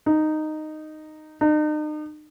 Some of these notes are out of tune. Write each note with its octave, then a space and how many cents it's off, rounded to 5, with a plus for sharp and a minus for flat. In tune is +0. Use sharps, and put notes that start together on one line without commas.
D#4 -10
D#4 -40